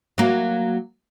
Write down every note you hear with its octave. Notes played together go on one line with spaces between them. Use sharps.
F#3 A#3